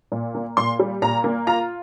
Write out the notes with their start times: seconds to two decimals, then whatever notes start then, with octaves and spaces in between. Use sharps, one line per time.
0.12 A#2
0.35 A#3
0.57 A#2 C6
0.79 G3
1.02 A#2 A#5
1.24 A#3
1.47 F4 A#5